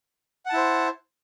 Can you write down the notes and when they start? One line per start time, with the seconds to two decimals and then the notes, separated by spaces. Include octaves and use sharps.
0.46 F#5
0.49 A5
0.53 E4
0.56 C5